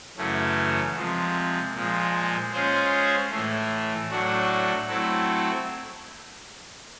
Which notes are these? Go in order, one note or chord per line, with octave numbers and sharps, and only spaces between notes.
F#2 C#3 E3 A3 C#4
C3 F3 G#3
A#2 F3 G#3
G#3 C#4 F4 G#4 C5
A2 E3 A3
A2 F#3 A3 D4 F#4
F#3 A3 C4 E4 A4